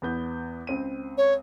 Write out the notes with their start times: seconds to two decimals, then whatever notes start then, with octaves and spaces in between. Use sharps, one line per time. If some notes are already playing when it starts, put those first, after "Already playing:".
0.02 E2 B3 G6
0.67 C#2 C4 D#7
1.18 C#5